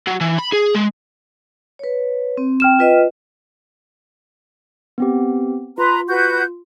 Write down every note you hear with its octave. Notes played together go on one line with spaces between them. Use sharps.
F#3
E3
B5
G#4
G#3
B4 C#5
C4
G5 F6 E7
F4 B4 D#5
B3 C4 G4
F4 B4 A#5 C6
F#4 B4 G6